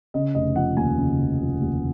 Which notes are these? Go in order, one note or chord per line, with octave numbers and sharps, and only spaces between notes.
C#3 D#5
F1 D#5
F3 F#5
D#2 G#5
C#3
F1
F3
D#2